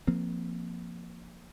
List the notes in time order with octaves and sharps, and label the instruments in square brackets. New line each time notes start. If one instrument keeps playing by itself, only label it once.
[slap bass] F3 A#3 C4